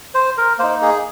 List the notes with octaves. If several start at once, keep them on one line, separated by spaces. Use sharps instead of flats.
C5
A#4
A#3 D#4 C5
G#4